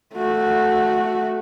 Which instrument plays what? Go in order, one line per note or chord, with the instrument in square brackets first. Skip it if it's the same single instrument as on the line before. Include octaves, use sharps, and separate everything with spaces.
[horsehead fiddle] A3 F#4